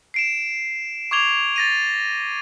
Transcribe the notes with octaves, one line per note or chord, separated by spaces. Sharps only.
C7 D7 E7
C#6 D6 G#6 F7 G7
A6 A#6 D#7